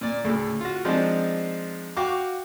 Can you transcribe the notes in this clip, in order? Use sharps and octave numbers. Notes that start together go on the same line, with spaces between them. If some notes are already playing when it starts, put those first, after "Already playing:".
A#2 D5
D2 A2 C#3
F4 F#4
F3 G#3 C4 D4 D#4 F4
F#4 F5 G5 C#6 D6